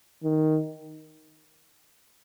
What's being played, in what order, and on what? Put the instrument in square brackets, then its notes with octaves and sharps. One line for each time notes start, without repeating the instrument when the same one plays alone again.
[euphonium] D#3